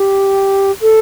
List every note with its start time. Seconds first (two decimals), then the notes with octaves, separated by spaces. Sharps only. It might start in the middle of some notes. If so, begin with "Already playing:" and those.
Already playing: G4
0.81 A4